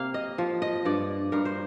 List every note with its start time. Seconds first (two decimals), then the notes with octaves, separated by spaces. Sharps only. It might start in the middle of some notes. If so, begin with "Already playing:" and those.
Already playing: C3 A#3 F5
0.14 D#5
0.38 F3
0.62 D#5
0.85 G2 D5
1.32 G2 A#4
1.45 C5